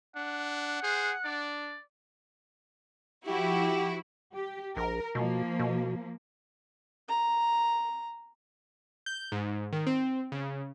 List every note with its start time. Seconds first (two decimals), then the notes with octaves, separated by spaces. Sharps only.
0.16 D4 F#5
0.83 G#4 C5
1.25 D4 D5
3.26 F3 E4 F#4 G4
4.34 G4
4.77 A#1 A#4
5.15 B2 F3 A#3
5.59 B2
7.08 A#5
9.06 G6
9.32 G#2
9.72 D#3
9.87 C4
10.32 C#3